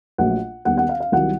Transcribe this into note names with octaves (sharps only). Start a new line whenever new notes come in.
A#1 A#2 F#3 A3 F#5
D#2 D#3 G3 B3 F#5
F#5
F5
F5
C2 C3 D#3 F#3 F#5